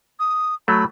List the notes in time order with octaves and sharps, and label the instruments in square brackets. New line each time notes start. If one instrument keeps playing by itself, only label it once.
[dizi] D#6
[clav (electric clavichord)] F#3 A3 [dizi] B5